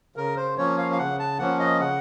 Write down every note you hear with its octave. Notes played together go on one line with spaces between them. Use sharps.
C#3 A#4
C5
F3 A#3 C#4 C#5
F5
F5
C#3 F#5
A5
F3 A#3 C#4 F#5
D#5
C#3 F#5